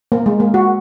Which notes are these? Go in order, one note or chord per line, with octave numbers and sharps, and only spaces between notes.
A#3
G#3
A#3
F#4